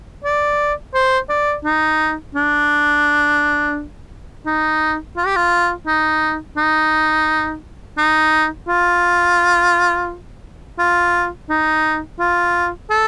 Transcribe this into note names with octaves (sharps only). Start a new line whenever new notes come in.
D5
C5
D5
D#4
D4
D#4
F4
G4
F4
D#4
D#4
D#4
F4
F4
D#4
F4
A4